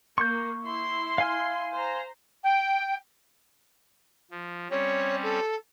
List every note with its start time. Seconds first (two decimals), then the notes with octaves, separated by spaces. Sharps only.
0.18 A#3 C#6 G6
0.64 E4 C6
1.18 F5 G#5 F6
1.73 C5 A#5
2.44 G5
4.31 F3
4.70 G3 C4 C#4 C#5
5.23 A4